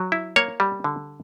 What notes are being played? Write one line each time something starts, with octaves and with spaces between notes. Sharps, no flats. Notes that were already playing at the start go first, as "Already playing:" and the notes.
Already playing: F#3
E4
A#3 C#5
G3
D3